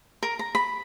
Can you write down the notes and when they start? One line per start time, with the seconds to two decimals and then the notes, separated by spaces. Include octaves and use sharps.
0.23 A#4
0.39 A#5
0.55 B5